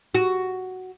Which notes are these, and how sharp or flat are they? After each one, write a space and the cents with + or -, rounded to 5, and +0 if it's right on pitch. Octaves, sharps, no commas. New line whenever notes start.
F#4 +5